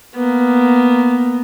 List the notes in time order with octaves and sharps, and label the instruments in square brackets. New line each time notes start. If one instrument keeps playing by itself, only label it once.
[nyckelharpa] A#3 B3